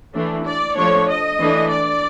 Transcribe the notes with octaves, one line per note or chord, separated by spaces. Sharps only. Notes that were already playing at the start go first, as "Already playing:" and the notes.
E3 A3 D4
D5
F3 A3 D4 C#5
D#5
E3 A3 D4
D5